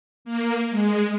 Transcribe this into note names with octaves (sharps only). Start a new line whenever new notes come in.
A#3
G#3